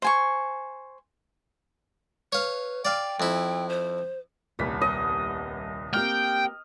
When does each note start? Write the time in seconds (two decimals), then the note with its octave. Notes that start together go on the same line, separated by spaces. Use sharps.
0.02 C5 G#5 C#6
2.33 B4 C#5 F5
2.85 D5 F5 G5
3.20 F2 E4
3.69 C5
4.59 D#1 C2 B3 B6
4.82 D#5
5.93 A#3 C4 G4 G5 F6